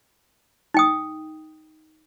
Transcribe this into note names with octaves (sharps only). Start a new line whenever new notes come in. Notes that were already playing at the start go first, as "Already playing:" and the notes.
D#4 G5 D#6